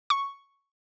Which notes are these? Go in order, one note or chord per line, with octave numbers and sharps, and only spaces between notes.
C#6